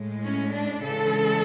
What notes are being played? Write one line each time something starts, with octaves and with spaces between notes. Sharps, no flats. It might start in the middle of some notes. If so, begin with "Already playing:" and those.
Already playing: A2 G#3
C#4
D4
C#3 E3 G#3 A4